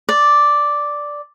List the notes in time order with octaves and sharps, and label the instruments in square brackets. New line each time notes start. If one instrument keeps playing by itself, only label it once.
[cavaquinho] D5